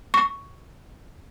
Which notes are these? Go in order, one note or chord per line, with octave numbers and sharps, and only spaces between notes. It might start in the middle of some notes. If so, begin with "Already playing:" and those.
C#6